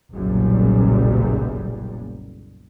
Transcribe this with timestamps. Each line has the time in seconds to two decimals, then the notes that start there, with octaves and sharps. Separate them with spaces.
0.12 F#1 B1 F#2 A#2 G3